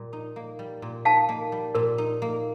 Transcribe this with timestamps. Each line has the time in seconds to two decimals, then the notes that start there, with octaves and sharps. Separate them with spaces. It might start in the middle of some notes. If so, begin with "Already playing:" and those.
Already playing: A#2 G3
0.13 D#4
0.36 A#3
0.59 G3
0.82 A#2
1.05 D#4 F5 A5
1.29 A#3
1.52 G3
1.75 A#2 A#4
1.98 D#4
2.22 A#3